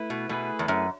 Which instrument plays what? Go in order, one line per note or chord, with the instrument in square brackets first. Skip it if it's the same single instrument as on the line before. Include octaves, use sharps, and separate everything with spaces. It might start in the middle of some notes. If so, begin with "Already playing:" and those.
Already playing: [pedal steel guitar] A3 E4 B4
[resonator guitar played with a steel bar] B2
[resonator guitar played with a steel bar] B2 [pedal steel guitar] A3 E4 G#4 B4
[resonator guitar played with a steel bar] E2
F#2